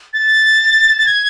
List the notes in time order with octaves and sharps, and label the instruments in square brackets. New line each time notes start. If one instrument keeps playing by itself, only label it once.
[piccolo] A6
A6
G#6